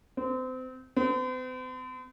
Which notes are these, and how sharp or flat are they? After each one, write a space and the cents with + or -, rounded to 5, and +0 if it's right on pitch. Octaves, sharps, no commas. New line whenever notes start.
C4 -30
C4 -45